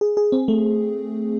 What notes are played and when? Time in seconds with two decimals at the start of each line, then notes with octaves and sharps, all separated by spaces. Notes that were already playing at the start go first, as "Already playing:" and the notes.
0.01 G#4
0.17 G#4
0.32 C4
0.48 A3